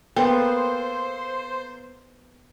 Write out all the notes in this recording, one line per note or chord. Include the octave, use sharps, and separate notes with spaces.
A#3 B3 A4 C5 G5